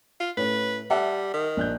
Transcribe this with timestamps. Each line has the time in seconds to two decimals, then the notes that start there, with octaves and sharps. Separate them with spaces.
0.20 F4
0.37 A2 C#4 B4
0.90 G3 E5 F#5 A5
1.34 D#3
1.57 A#1 F#6 G6